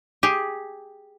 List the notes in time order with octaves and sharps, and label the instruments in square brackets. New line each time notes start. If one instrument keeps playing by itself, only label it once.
[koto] G4 G#4